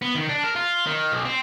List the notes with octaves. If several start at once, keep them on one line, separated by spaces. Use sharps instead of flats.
B3
D#3
D4
A#4
F4
D#3
B1
C4